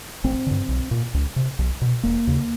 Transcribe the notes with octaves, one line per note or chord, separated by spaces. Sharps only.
A1 C4
G2 D3
B1
A#2
C#2
C3
B1
B2
E1 A#3
D#2 C#3